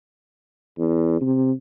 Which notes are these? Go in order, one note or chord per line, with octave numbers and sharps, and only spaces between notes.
E2
C3